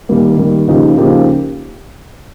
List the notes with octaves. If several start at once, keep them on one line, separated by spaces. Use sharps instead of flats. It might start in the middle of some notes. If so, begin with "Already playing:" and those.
D#3 G3 A#3
D#3 G3 A#3
C#3 F3 A#3 D#4 G4
C#3 F3 A#3 D#4 G4